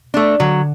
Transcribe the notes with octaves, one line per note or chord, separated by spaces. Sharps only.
A3 D4
D3 F#3